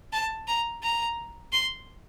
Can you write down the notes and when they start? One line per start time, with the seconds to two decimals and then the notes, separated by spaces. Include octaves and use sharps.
0.13 A5
0.48 A#5
0.83 A#5
1.53 C6